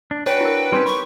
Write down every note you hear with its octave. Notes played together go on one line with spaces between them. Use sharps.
D4
D4 F#4 B4 C#5 G5 G#5
E4 A#4
G3 C4 C#4 D#4 G#5 C6
G4 B5 C#6